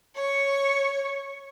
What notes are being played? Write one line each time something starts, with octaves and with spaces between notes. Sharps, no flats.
C#5 C#6